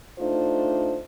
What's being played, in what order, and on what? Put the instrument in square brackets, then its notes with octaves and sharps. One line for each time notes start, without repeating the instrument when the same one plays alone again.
[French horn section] A3 D4 D#4 F4 C5